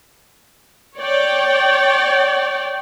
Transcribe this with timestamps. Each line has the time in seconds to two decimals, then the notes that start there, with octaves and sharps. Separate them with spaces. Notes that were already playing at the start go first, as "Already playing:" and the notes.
0.98 C#5 D5 G5